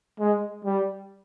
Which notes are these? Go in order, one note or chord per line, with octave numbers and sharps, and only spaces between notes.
G#3
G3